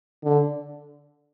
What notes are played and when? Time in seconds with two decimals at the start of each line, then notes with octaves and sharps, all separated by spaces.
0.24 D3